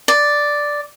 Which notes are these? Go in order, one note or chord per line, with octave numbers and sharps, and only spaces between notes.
D5